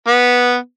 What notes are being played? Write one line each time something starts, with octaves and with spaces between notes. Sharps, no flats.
B3